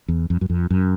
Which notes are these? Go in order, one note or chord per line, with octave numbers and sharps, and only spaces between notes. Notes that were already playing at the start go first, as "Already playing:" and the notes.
E2
F2
F#2
F2
F#2